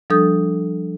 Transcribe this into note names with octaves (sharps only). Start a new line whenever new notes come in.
F3 G3 D4 A4 D#6 G6